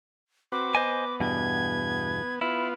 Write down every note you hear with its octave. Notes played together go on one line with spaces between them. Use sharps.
C4 F#4 B4 D6
B3 C5 D#5 G#5
E2 G2 B2 G#6
B3 E4 F4